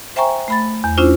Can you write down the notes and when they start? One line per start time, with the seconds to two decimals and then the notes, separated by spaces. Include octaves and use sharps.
0.16 C5 E5 G5 G#5 A#5 C#6
0.48 A3 B5 A6
0.84 E2
0.97 C#4 D4 E4 F4 C5